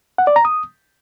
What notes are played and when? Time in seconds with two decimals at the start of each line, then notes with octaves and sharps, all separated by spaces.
0.18 F#5
0.27 D5
0.36 A#5
0.45 D#6